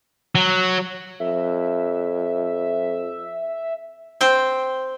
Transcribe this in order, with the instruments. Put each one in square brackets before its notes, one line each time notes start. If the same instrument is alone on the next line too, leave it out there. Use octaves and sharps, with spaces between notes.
[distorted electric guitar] F#3
[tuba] F2 [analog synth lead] E5
[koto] C4 C5 G5